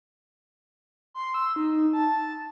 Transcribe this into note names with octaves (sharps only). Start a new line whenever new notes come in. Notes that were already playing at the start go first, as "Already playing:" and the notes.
C6
E6
D#4
A5